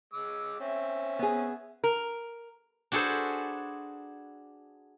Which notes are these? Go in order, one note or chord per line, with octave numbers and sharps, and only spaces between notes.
G#3 D6 E6
C4 C#4 E5
B3 G#4
A#4
D4 F#4 G#4 A4 B4 C5